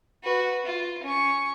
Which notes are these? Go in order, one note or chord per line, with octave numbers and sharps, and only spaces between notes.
F#4 B4
F4
C#4 C#6